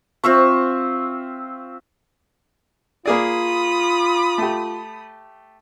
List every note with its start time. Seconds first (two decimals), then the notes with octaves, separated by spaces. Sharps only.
0.24 C4 F4 E5 C#6
3.06 A#3 F4 G#4 D5 B5 D#6
4.38 A3 G4